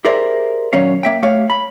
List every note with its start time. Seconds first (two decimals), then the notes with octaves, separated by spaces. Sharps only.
0.05 G4 G#4 A#4 C5 D5 E5
0.73 D#2 A#2 F#3 C#4 C#5 F5
1.03 A#3 E5 G5
1.23 A3 G4 C#5 F5
1.50 B5